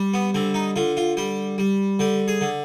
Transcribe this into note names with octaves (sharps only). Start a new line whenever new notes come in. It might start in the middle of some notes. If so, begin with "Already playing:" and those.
Already playing: G3
B3
D3 C4
D#4
D3 F4
F4
G3 G4
G3
D3 G4
G#4
D3